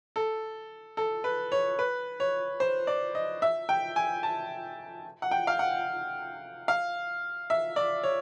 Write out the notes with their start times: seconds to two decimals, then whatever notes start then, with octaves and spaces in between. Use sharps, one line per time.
0.16 A4
0.97 A4
1.24 B4
1.52 C#5
1.79 B4
2.20 C#5
2.60 C5
2.87 D5
3.15 D#5
3.42 E5
3.69 G5
3.96 G#5
4.23 A5
5.22 F#5
5.31 G5
5.47 F5
5.59 F#5
6.68 F5
7.50 E5
7.76 D5
8.03 C#5